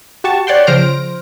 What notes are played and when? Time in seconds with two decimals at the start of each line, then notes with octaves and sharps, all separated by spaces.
0.24 F#4 G4 A5 C#6
0.47 C#5 D5 F#5 G5 C6
0.67 C#3 F3 C5 F6 A#6 D7